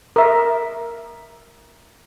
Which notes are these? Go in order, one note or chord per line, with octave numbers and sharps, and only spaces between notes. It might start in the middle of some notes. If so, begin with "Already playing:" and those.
A#4 E5